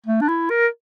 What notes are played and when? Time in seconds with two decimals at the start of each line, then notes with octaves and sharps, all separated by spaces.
0.06 A3
0.21 D4
0.28 E4
0.50 A#4